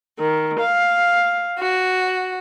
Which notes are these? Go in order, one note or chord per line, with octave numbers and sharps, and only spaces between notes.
D#3
F5
F#4